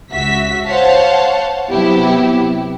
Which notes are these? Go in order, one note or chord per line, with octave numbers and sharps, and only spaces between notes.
C#2 C#3 F#4 E5 B6
C5 C#5 F5 F#5 A5
C3 F#3 B3 E4 G4